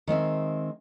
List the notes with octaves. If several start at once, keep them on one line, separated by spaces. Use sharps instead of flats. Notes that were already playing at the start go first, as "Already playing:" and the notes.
D#3 G#3 C4 E5